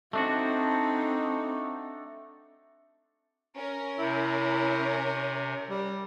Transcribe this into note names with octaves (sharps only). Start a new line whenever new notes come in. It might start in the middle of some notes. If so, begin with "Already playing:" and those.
A3 C4 D4 D#4 F#4
C#4 A#4
C3 E4
G3